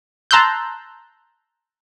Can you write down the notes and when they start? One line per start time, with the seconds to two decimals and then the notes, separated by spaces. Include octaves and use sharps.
0.31 A5 A#5 C6 E6 F#6 G6